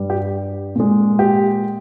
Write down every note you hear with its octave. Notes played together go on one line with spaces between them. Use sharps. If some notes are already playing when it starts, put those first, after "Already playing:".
Already playing: G2 G3
G4
A#2 G#3
G4